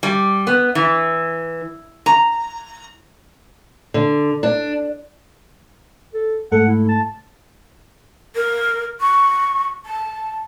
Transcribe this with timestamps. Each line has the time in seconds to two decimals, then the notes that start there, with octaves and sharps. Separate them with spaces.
0.03 G3
0.47 B3
0.75 E3
2.06 A#5
3.94 D3
4.43 D4
6.14 A4
6.52 G#2 A3 A4 F#5
6.67 E4
6.88 A5
8.35 A#4
9.00 C#6
9.85 A5